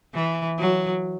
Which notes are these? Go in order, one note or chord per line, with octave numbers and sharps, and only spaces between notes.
E3
F#3